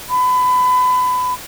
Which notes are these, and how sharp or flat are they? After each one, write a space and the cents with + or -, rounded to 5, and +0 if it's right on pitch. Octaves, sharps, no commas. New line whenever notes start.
B5 +25